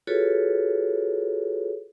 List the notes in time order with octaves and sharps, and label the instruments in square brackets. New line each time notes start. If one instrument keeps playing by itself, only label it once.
[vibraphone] F4 F#4 G#4 A4 B4 C#5